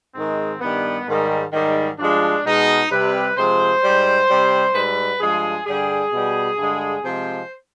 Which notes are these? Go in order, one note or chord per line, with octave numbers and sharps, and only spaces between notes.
G#2 D#3 G#3 C4
G2 D#3 G3 B3
G#2 D#3 G3
G#2 D#3 G3
G2 F3 G#3 D4
B2 G#3 D#4
C3 G3 B4
C3 F3 G#3 C5
G#2 G3
C3 G3
G#2 G3 B4
G2 F3 G#3 G#4
G2 D3 G3 G#4
B2 G3
G2 D3 G#3
C3 F3 G#3 C5